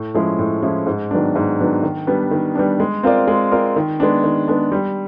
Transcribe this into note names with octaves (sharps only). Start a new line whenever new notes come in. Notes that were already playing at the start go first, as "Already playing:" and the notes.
Already playing: A2
F3 G#3 C#4 E4
A2
F3 G#3 C#4 E4
G#2
D#3 F#3 B3 D4
G#2
D#3 F#3 B3 D4
D#3
G3 B3 D4
D#3
G3 B3 D4
G#3
C4 F4 A#4 D5
G#3
C4 F4 A#4 D5
D#3
G#3 B3 D4
D#3
G#3 B3 D4
G3